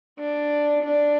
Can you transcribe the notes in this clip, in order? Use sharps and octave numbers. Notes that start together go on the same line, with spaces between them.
D4
D4